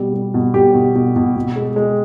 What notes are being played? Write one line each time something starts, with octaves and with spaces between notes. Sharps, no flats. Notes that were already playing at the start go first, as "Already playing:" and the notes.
Already playing: B2 G3
G3
B2
B2 G4
B2
B2
B2
B2
G#3
G#3